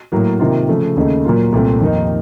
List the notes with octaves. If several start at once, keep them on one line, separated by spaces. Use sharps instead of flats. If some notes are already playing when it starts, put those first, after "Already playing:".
A2 F#3 A#3
C3 D#3 A#3 F4
C#3 F3 A3
D#2 C#3 A3 D#4
A#2 F#3 A#3 F4
C2 A#2 A3 C4
F2 D#3 A#3 D#4